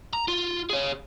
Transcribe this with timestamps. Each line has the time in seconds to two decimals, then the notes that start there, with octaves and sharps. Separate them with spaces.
0.13 A#5
0.28 F4
0.70 G#4 C#5